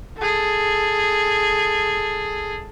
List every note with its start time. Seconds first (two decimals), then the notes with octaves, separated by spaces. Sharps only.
0.18 G#4 A4